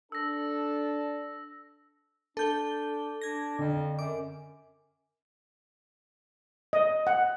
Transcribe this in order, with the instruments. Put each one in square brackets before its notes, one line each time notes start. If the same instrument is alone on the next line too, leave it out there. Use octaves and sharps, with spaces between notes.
[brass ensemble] D4 A4 [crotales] E6 A#6
[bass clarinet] D4 [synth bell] A4 G6 G7
[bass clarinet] D4 [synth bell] G#6 A#6
[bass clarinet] F2 [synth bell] D3
[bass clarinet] F#2 [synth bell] D6
[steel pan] D#5
F#5